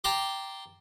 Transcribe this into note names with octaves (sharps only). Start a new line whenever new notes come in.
G5 A5 A#5 C6 D6